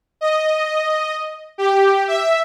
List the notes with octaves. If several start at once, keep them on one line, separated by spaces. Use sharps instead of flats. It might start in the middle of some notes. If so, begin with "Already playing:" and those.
D#5
G4
E5